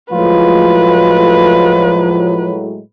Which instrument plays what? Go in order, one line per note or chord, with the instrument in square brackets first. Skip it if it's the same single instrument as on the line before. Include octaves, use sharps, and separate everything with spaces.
[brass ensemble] A2 F#3 G#3 [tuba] F3 [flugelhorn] F4 [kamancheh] B4